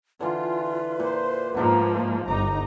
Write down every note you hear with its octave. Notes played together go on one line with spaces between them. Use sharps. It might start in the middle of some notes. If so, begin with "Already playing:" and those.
D3 E3 F4 B4
A#2 C5
G#2 F3 A#3 B3 D4 D#4
G1 D#4 A#5 D6